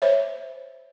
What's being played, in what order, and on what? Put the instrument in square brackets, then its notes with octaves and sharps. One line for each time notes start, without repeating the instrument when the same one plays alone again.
[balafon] C5 C#5 E5